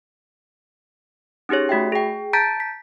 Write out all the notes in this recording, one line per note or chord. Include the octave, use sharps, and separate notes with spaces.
C#4 D#4 G4 G#4 C#5
A3 F#4 E5 G5
G#4 G5
A5 A#5 G6 A6 B6 D7
B6